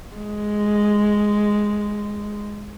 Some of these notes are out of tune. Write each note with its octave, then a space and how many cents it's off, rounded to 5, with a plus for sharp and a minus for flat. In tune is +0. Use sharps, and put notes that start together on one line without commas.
G#3 +0